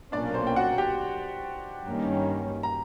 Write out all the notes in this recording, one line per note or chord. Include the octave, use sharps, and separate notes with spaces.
B1 A#2 F#3 A#3 C#4 D4 D5
C5
G5
F#4 F#5
G4 G5
G2 D#3 G3 A#3 C#4
A#5